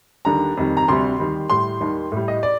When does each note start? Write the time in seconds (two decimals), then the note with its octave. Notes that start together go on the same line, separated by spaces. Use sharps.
0.25 D#2 D3 G3 A#5
0.57 F2 D#3 G3
0.77 A#5
0.88 D2 C3 G3 C6
1.20 D#2 D#3 G3
1.50 A2 G3 C6
1.81 D#2 D#3 G3
2.12 A2 G3
2.28 D#5
2.43 D5